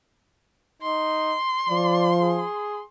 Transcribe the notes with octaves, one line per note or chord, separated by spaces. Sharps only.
D#4 C6
F3 D5
G#4